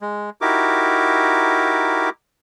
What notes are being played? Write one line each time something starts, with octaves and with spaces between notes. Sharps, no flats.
G#3
D#4 E4 F#4 G4 A#4 D6